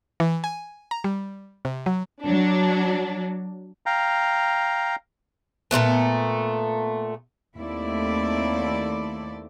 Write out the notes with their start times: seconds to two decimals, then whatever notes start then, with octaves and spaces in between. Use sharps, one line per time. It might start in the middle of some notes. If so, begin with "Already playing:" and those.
0.20 E3
0.44 G#5
0.91 A#5
1.04 G3
1.65 C3
1.86 F#3
2.23 F#3 D4
3.86 F5 G5 A#5
5.71 A#2 F3 A3 B3
7.56 D#2 A3 C4 E4 A4 D5